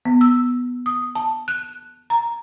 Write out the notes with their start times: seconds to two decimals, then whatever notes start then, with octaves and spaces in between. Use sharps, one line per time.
0.05 B3
0.21 E6
0.86 D#6
1.15 A5
1.48 F#6
2.10 A#5